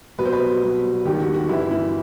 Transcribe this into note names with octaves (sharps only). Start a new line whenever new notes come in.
C2 B2 F#3 B4
C5
B4
C2 B2 F#3
E1 D#2 D#3 G4
F#4
F#4
G1 G2 E3 E4
E4